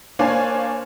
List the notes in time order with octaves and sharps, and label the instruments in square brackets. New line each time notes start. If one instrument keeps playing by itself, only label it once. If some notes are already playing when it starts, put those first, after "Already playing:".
[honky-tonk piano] A#3 D4 C5 C#5 F5 G#5